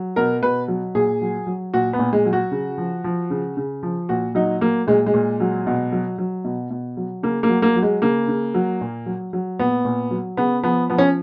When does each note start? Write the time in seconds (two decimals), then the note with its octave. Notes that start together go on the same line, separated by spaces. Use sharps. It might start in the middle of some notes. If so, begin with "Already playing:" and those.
Already playing: F#3
0.16 B2 A#4
0.42 B2 B4
0.68 F#3
0.95 A#2 G#4
1.22 F#3
1.47 F#3
1.74 A#2 F#4
1.93 B3
1.99 A#2
2.13 G#3
2.25 F#3
2.33 F#4
2.51 C#3
2.78 F3
3.04 F3
3.30 C#3
3.57 C#3
3.83 F3
4.09 A#2 F#4
4.35 F#3 D#4
4.61 F#3 A#3
4.87 A#2 G#3
5.06 G#3
5.14 A#2
5.40 F#3
5.67 B2
5.92 F#3
6.18 F#3
6.45 B2
6.70 B2
6.97 F#3
7.23 C#3 A#3
7.43 A#3
7.49 F#3
7.62 A#3
7.76 F#3
7.82 G#3
8.02 C#3 A#3
8.28 C#3
8.54 F#3
8.81 A#2
9.06 F#3
9.33 F#3
9.59 A#2 B3
9.85 A#2
10.11 F#3
10.37 C#3 B3
10.63 F3 B3
10.90 F3 B3
10.98 C#4